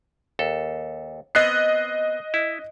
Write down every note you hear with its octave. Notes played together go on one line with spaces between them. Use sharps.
D#2 A4
B3 C4 D#5 F#6 C7
E4